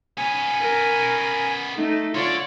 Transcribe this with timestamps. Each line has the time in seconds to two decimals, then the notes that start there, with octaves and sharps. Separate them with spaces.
0.17 B3 C#4 G#5
0.61 A#4
1.76 A3 D#4
2.15 D3 F4 C#5 D5